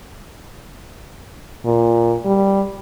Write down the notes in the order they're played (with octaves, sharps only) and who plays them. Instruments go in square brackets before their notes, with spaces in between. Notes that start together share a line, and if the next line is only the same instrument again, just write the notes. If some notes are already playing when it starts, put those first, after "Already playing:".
[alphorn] A#2
G3